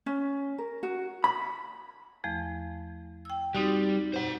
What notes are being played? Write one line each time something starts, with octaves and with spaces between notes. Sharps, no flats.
C#4
A#4
F#4
B5
E2 F3 A3
G5 E6
G3 C4 D#4 F#4
C5 F#5